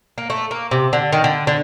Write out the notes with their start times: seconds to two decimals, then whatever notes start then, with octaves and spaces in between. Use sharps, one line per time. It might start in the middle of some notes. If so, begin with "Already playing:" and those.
0.18 A#3
0.30 A3
0.51 A#3
0.71 C3
0.93 D3
1.12 D#3
1.24 D3
1.47 D3